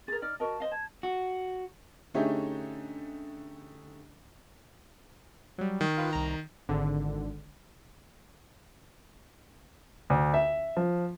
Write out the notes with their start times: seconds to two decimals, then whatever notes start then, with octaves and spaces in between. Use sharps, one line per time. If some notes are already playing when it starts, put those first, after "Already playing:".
0.08 G#4 A#4 A6
0.22 D#4 D5 F6
0.40 F#4 A#4 D#5 A5
0.60 C5 D#5 F5
0.72 A5 G#6
1.03 F#4
2.14 D3 A3 C#4 D#4 G4 G#4
5.58 F#3 G3
5.81 D#3
5.98 F4 B4
6.13 C2 A#5
6.69 G#1 D3
10.10 D2
10.34 E5
10.77 F3